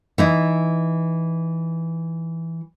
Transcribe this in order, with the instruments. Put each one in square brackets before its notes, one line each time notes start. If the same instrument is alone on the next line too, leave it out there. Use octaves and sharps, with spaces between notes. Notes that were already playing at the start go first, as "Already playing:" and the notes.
[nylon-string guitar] E3 D#4 E4